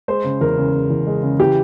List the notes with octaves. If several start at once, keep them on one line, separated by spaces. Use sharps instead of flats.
G#3 C5
C#3
E2 A#4
C#3
C#3
E2
G#3
C#3
E3 G4